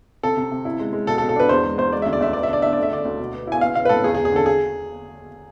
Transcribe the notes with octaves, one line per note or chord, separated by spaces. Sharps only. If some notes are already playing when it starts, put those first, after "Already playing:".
C3 A4
C3
C3
E4
G#3
G#3
B2 A4
A4
B2
A4
D4 B4
E2 C5
G#3
E2 C5
G#3 D5
D2 E5
D5
D2 E5
B3 D5
E5
D4 D5
D4 E5
A3 D5
E5
D3 D5
D2
B2
B3
E4 G#5
B3 F5
B3 F5
B4
A2 A4
E2 G#4
G#4
E2
G#4
D3 A4
G#4